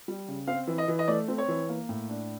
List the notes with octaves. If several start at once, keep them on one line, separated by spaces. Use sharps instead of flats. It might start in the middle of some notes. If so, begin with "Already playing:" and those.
G3
C#3
C4 F5
E3
D#5
E3
D#5
A3 D5
C4
C#5
E3
A#3
A2
D4